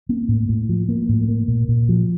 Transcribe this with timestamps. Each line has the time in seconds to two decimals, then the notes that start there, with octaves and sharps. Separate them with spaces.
0.09 A#3
0.29 A2
0.49 A2
0.69 F3
0.89 A#3
1.09 A2
1.28 A#3
1.48 A#2
1.68 A#2
1.89 F3